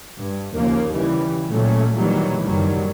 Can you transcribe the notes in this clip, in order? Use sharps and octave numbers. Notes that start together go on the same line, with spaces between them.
G2
D#2 C#3 F3 A#3
C#3 E3 G3
A#2 F#3 A3 C#4
A#2 D#3 E3 F#3 G3
F#1 D#3 F#3 G3